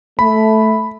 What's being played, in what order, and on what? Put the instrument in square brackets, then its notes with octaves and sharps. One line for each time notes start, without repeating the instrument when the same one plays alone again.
[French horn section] A3 [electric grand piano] B5